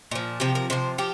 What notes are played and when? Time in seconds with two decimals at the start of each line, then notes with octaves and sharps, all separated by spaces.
0.11 A#2 F3
0.40 C3 F3 G4
0.55 A#4
0.70 C3 F3 C5
0.98 F3 G4